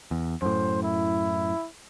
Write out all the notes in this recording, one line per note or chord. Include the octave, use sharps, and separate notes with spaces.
E2
F#2 A2 C5
E4